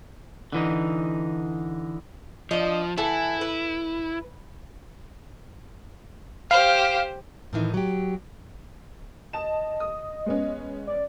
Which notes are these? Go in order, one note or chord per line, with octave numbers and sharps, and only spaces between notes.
D3 E3 D#4
F3 D4 D#5
E3 E4 A4 F#5
B4
G4 C5 F5
A2 D#3 E3 D#4
F#3 G4
D#5 A5 E7
D#6
G#3 B3 C#4
D5